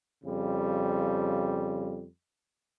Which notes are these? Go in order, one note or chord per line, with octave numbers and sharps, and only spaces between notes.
F2 C#3 G3